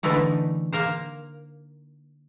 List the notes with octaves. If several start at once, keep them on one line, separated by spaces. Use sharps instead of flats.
D3 E3 A3 D#4 E4
A#3 A#4 C5